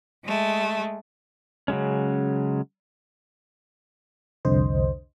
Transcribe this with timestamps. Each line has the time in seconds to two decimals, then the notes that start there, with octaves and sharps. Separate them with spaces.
0.24 G#3 A3
1.68 C#3 F#3 G#3 C#4
4.45 C2 F2 D3 C5 D#5